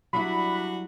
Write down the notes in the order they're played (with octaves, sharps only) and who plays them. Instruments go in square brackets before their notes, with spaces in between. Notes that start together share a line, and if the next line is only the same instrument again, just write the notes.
[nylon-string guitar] F#3 G3 E4 [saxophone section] D4 F#4 [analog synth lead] B5